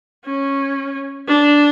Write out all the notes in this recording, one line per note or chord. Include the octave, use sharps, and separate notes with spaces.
C#4
D4